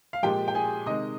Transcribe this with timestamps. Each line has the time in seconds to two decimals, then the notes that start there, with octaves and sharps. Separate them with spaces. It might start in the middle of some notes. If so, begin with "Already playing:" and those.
0.13 F5
0.23 A#2 F3 G#3 G4 G5
0.48 G5
0.55 G#4 G#5
0.86 C3 D#3 G#3 D#5 D#6